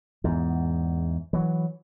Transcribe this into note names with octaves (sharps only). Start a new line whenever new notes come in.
E2 G#2
E3 F#3